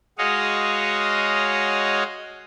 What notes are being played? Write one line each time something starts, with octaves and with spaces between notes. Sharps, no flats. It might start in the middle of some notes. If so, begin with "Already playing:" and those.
G#3 F#4 G#4 C#5 D#5 F5